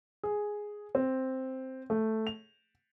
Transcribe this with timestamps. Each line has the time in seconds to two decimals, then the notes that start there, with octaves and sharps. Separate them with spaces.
0.23 G#4
0.95 C4
1.90 A3
2.27 F7